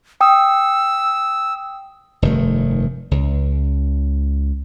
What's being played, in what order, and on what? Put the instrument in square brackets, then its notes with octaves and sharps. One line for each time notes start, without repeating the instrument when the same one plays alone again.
[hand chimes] G5 D#6 [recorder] E6
[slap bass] F1 G2 D#3 A3
C#2